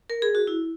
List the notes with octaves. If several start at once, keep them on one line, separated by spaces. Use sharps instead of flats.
A#4
G#4
F#4
E4